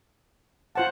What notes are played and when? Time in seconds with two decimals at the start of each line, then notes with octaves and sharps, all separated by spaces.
0.75 F4 C5 F#5 A5